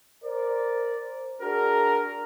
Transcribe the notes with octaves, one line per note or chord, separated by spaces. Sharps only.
A#4 C5 D5
D4 F#4 G#4 A#4